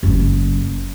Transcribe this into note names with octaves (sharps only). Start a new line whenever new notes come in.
F#1 F#2